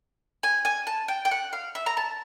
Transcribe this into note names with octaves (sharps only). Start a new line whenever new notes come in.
G#5
G#5
A5
G5
G5
F#5
F5
E5
A#5
A5